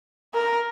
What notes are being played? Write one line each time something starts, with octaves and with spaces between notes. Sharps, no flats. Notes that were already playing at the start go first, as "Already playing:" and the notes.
A#4